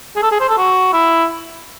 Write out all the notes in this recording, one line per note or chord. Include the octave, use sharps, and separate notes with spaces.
G#4
A4
G#4
C5
A4
F#4
E4